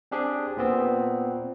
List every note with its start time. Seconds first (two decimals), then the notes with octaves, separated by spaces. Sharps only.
0.11 C4 D4 G4 G#4
0.57 A#2 B3 C4